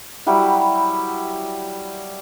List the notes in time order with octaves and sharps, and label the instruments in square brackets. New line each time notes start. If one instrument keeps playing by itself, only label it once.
[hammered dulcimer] F#3 G3 E4 F#5